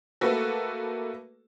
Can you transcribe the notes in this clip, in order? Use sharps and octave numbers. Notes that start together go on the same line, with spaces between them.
A3 A#3 F#4 A4 B4